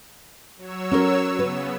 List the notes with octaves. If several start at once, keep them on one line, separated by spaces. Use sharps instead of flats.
F#3 C#5 E6
C#4 F#4 A#4
C#3 B3 B4